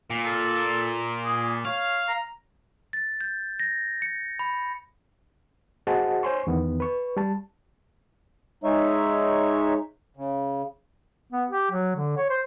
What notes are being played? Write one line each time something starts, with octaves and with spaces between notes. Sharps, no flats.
A#2
A4
G#4
C#5 F5
A#5
A6
G6
A#6
C#7
B5
F#4 G#4 C5 D#5 F#5 A5
C5 C#5 G#5 C6 C#6
E2 D#3 B3
B4 C#6
G3 A5
G#3 D#4 C#5 E5
C#3
B3
G4
F#3
D3
C#5
C5